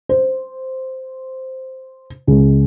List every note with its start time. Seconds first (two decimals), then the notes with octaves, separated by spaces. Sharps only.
0.09 C5
2.27 C#2